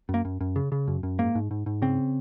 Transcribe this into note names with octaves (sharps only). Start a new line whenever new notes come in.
F#2
A#3
F#2
F#2
C#3
C#3
F#2
F#2
G#2 A#3
G#2
G#2
G#2
C#3 C4